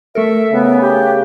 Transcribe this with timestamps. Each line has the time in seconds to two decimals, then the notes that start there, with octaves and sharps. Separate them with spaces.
0.15 A3 A4 A#4 E5
0.53 C#3 B3
0.81 G4